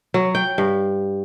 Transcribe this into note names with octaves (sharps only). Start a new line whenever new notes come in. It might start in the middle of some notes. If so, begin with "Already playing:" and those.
F#3
G5
G2